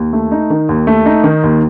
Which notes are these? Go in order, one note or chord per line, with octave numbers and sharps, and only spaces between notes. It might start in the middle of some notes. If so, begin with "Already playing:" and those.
Already playing: D#2
A3
D#4
D#3
D#2
A3
D#4
D#3
D#2